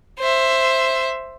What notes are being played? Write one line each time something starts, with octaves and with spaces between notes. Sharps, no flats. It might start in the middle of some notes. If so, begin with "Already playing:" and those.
C5 E5